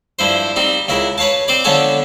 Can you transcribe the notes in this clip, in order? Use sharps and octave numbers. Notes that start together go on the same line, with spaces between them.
G2 F3 E4 C5
G3 C4 D#4
C#2 C#3 E4 A#4
B4 C#5 F5 A5
C4 C5 D5
D3 F3 B3 A4 C#5 G#5